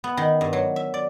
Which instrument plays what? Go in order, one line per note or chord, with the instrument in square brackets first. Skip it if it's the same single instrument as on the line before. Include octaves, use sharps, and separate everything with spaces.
[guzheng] B3
D#3
G2
F#3
E5
D5